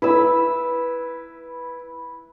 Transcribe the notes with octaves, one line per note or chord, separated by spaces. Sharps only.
E4 B4 E6